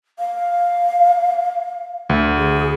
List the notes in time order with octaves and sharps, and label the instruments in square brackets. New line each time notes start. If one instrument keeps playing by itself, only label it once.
[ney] F5
[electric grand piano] D2
[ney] G#4